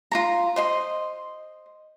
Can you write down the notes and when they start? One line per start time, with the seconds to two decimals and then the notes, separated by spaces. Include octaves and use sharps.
0.11 F4 F#4 A#5
0.56 C5 D#5 C6